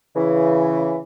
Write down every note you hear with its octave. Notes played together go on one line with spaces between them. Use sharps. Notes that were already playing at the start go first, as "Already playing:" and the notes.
C#3 E3